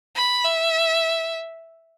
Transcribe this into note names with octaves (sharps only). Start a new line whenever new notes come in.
B5
E5